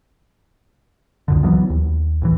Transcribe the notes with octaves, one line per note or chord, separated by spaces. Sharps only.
C#2 F#2 D3
E3 F#3 A#3 B3
D#2
A1 D#2 E3